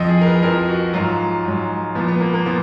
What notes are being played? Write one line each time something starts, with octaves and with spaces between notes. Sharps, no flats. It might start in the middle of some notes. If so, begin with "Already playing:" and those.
Already playing: F2 F3 D#5
G#4
A#4
B4
F2 F3 A#4
F#4
G#2 F#3 F4
G#2 F#3
A#2 F3 B3
B3
A#3
A#3
A#2 F3 B3